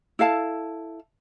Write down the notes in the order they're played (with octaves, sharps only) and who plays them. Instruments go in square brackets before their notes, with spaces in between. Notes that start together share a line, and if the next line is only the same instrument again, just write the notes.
[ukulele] E4 A4 F5 A5